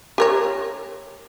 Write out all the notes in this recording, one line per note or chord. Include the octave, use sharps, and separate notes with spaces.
G4 A#4 C#5